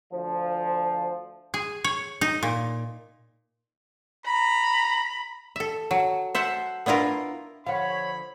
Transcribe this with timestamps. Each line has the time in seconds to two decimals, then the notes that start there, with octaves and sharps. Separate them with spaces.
0.13 D2 F3
1.54 G#4
1.84 C#5
2.21 D#4
2.43 A#2
4.26 A#5 B5
5.56 A4 E5
5.91 F#3
6.35 C5 E5 F#5 A5
6.86 B3 D4 E4 F4 A#4
7.66 D3 F3 C#5 F5 F#5 B5